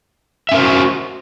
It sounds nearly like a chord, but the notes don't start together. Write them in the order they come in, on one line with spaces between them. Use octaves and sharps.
E5 C#4 A#4 C5 F#4